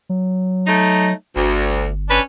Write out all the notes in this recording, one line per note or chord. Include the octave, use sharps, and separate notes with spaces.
F#3
A3 D#4
G1 D2
C#4 D4 B4